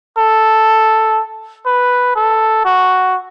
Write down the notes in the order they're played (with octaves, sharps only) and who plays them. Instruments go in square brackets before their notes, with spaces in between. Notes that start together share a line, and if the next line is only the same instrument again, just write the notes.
[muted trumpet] A4
B4
A4
F#4